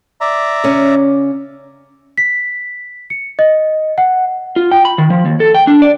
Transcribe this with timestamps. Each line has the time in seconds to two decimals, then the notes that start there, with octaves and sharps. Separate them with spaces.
0.21 D5 E5 A#5
0.64 C#3 C#4
2.18 B6
3.10 C#7
3.39 D#5
3.98 F#5
4.56 F4
4.72 G5
4.85 B5
4.98 D#3
5.10 F3
5.26 D#2
5.40 A4
5.55 G5
5.67 D4
5.82 D5